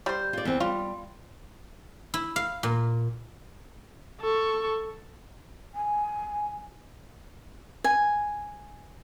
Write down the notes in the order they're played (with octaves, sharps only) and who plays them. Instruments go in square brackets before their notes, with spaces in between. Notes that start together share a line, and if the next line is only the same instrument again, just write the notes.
[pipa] G3 C5
[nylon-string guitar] F4 D5
E2 C4
[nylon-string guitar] G3 [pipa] F4
[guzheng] E4
F5
A#2
[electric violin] A4 C#6
[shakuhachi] G#5
[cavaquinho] G#5